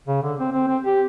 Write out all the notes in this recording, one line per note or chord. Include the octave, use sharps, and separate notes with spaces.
C#3
D3
C4
C4
C4
G4